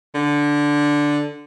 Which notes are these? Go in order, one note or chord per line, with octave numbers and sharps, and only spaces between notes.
D3